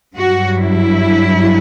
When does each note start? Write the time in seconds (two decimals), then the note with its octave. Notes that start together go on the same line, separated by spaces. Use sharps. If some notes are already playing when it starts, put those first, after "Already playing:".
0.15 G2 F#3 F#4
0.57 E4